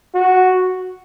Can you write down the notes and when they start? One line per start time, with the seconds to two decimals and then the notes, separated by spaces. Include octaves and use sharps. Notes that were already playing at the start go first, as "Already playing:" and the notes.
0.15 F#4